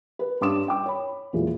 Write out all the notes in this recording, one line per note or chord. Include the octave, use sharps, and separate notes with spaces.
B4
G2 C#4 C6 D6 D#6 E7
G5 D6
C#5 B5
E1 A#2 E3 G#4